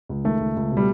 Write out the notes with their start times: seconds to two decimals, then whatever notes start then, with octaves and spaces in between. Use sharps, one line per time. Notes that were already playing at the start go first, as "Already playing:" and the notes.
0.09 C#2
0.24 D#3 A3
0.40 C#2
0.56 C#2
0.72 B2 G3